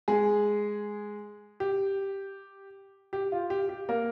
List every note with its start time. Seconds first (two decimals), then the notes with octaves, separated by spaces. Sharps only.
0.08 G#3 G#4
1.60 G4
3.13 G4
3.32 F4
3.50 G4
3.69 G4
3.89 A#3 A#4